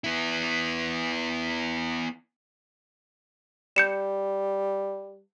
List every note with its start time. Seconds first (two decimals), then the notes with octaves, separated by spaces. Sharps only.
0.04 B3 E4
3.76 G3 G6 C#7 E7